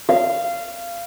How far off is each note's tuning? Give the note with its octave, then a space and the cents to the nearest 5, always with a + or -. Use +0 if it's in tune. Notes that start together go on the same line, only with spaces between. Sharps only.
F5 -20